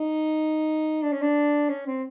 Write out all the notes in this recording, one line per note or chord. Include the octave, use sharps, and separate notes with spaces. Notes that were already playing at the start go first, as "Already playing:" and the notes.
Already playing: D#4
D4
C#4
D4
C#4
C4